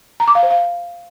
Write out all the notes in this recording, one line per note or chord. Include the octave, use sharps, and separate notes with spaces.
A#5
D6
F5
C5
F5